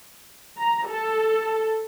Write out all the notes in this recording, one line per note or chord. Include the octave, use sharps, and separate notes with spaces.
A#5
A4